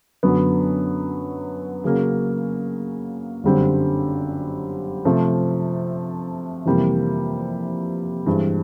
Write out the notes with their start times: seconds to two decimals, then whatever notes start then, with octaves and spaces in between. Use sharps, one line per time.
0.23 F#2 D3 F#3 B3
1.84 C#3 F#3 A#3 C#4
3.44 G1 F#2 D3 G3 C4
5.05 C3 F3 A3
6.66 F2 C3 E3 G3 A#3
8.26 G2 E3 G#3 C4